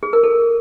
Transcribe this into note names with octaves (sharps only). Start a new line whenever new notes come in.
G#4
A#4
A4